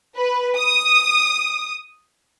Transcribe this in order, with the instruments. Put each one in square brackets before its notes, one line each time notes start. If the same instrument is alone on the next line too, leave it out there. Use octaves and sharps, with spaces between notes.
[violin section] B4
D#6